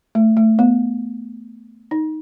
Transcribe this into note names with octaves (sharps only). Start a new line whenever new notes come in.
A3
A3
B3
D#4